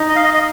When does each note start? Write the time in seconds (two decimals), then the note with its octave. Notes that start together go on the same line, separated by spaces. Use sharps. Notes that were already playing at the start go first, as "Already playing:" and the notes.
Already playing: D#4
0.08 D#5
0.16 F5
0.24 D#5
0.34 D#5